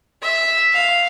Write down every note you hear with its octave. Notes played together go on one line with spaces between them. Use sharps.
E5
F5